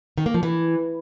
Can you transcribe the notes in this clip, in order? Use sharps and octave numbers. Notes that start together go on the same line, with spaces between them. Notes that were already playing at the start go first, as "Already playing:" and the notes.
D#3
A#3
F3
E3